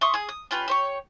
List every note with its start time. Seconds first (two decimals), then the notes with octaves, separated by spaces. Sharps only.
0.01 E5 C6 C#6 D#6
0.14 G#4 D#6
0.29 D#6
0.51 C#4 F4 G4 B4
0.68 G4 C5 C#5